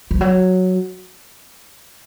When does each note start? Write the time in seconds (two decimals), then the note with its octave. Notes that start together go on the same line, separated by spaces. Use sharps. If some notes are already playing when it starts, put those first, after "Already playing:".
0.11 F3
0.21 F#3